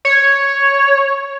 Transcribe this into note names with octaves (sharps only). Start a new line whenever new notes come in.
C#5